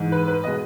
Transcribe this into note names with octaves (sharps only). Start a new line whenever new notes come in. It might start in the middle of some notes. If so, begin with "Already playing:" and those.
Already playing: G#2 E3 G#3
B4
B4
B2 G#3 D#5